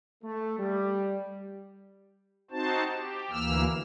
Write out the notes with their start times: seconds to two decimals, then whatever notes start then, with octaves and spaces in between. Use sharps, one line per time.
0.24 A3
0.59 G3
2.51 C4 D#4 F#4 C5 A5
2.92 G4
3.31 D2 E3 A#3 E6 F6